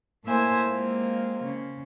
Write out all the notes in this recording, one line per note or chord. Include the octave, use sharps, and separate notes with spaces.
A2 A#3 C5 E5 G#5
G#3 A#3 C4 F4
C#3